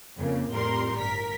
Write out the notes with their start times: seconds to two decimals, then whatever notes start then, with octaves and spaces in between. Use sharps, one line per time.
0.18 F2 C#3 A#3
0.53 F2 A2 G3 A#4 C6
0.97 G1 A#4 B6